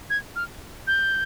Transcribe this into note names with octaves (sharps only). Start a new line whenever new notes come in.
G#6
F6
G6